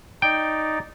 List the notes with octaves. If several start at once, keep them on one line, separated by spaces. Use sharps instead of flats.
D#4 D5 G5